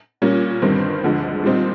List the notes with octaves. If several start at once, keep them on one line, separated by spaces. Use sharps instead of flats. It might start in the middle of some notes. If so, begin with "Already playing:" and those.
A#2 G3 A#3 C#4
G1 G2 D#3 G3 C4
D2 D3 F3 G#3
A#2 G3 C4 D#4